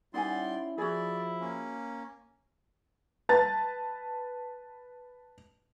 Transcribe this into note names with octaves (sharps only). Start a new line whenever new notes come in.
G3 C#4 D#4 E4 D5 F#5 G#5 C6
F3 E4 F#4 G#4 D5
A#3 C#4
B4 A5 A6